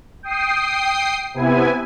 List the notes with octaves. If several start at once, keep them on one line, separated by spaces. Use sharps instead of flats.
G5 D#6 C7
C3 B3 E4 G#5